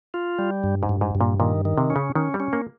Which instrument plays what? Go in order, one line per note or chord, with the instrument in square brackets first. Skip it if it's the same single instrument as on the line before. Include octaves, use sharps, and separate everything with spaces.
[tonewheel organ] F4
G3
G2
[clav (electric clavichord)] G#2
[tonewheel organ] G2
[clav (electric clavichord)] G#2
[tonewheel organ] G2
[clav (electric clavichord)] A#2
[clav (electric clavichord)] A#2 [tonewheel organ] D#3
[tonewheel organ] D#3
[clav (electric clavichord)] C3
[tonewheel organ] C#4
[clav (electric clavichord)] C#3
[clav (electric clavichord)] D#3 [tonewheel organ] C#4
[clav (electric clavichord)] G3
[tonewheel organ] C#4
[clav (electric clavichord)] A#3